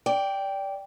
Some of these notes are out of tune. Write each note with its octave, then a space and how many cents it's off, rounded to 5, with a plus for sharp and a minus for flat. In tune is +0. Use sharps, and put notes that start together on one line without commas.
D5 -15 G5 +0